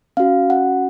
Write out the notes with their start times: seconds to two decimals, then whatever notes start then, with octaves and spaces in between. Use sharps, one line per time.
0.17 C#4 F#4 F5
0.50 F#5